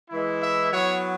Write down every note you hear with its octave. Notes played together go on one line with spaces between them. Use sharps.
E3 G#3 E4
E5
F#3 B3 E4 C#5